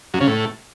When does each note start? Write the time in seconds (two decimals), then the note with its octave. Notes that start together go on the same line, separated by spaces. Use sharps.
0.14 F#2
0.21 C#3
0.27 A2